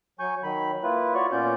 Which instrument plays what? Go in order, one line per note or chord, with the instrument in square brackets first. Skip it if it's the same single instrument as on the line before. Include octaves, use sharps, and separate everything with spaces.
[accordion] F#3 G#5 C#6 G6
D#3 F#3 B5
A#3 E4 F4 B4
F4 F#4 C#5 D5 C#6
A#2 B3 C#4 F4 D5 G6